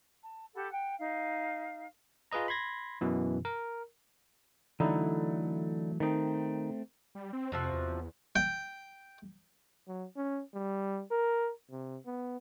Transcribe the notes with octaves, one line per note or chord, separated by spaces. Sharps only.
A5
G4 A4 F#5 B5
F#5 G5
D#4 F5
F4 G#4 B4 D#5 A#5
B5 C6 G#6 A#6
F#2 B2 E3
A#4
D3 E3 F#3 A3 D#4 E4
D#3 A3 C4 D#4
G3
C4
F2 C3 F3 F#4
E2
G5
F#3
C#4
G3
A#4
C3
B3